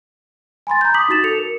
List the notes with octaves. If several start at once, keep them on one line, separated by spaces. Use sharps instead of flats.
G#5 B5 C6 A6
A#5 G6
D6 D#6 B6 F#7
D#4 F#4 A6 E7
A4 C#7 F7
A#4